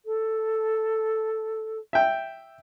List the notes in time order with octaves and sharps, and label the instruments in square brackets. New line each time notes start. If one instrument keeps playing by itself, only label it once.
[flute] A4
[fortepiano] E5 G5